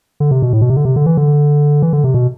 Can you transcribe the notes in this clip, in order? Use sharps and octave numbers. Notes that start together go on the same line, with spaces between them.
D3
C3
B2
A2
B2
C3
D3
C3
D3
E3
D3
E3
D3
C3
B2